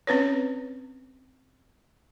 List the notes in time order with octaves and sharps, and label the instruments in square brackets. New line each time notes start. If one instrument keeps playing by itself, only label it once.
[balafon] C4 C#4 B4 C#5